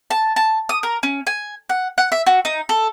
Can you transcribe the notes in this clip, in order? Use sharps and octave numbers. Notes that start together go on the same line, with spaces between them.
A5
A5
D#6
A#4
C#4
G#5
F#5
F#5
E5
F#4
D#4
A4